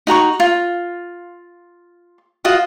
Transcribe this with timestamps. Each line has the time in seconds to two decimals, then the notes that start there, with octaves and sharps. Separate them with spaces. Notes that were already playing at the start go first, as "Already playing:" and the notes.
0.07 D#4 F#4 A#5 C#6
0.40 F4
2.45 F4 F#4 D#5 F5